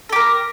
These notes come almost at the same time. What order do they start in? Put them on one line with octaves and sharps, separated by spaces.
A4 G4 A#4